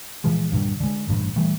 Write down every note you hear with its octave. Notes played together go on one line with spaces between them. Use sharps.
A#2 E3 F3 G#3
G2 A#2 D3 G3
D3 G#3
A1 G2 A#2
A#2 E3 G3 A3